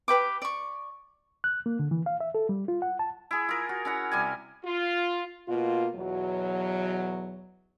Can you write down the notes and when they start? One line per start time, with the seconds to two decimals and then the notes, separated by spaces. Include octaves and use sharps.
0.08 G4 B4 G5 D6
0.42 D5 C#6
1.44 F#6
1.66 A#3
1.79 D3
1.91 E3
2.06 F5
2.20 E5
2.35 A4
2.49 G3
2.68 F4
2.82 F#5
2.99 A5
3.31 E4 G#4
3.49 F4 A#4
3.69 F#4
3.85 C#4 E4 F#5
4.12 C3 G3 G#5
4.65 F4
5.48 B2 A#3 F4
5.95 E2 B2 F#3